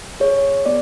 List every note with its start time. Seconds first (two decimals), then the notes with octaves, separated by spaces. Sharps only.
0.20 G#4 C#5
0.66 B3 D5